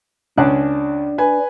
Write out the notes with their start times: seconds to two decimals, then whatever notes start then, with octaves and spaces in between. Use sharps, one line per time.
0.38 C#2 C#4 D4 F#6
1.18 B4 G#5